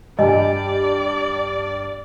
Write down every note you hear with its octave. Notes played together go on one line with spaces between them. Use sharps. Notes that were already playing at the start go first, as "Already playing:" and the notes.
G2 G4 D5 D#5 G#5